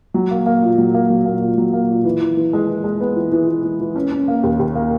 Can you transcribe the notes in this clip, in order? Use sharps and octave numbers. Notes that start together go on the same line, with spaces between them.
F#3
A#3
A#3
A#2
F#3
A#3
F#3
A#3
A#2
F#3
A#3
A#2
E3
E3
E3
G#3
E3
G#3
B3
E3
E3
E3
E3
E3
C#4
C#4
A#3
D#2
D#2
A#3